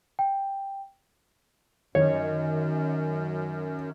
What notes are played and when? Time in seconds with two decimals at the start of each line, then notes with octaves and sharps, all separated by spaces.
0.19 G5
1.95 F#2 D#3 C#5